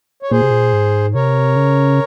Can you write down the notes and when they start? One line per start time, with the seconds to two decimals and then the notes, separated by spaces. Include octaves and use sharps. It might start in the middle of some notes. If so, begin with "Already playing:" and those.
0.23 C#5
0.31 A#2 G#4 C5
0.42 C3
0.51 A#2
0.73 G#2
1.14 C3 A#4 C#5
1.56 C#3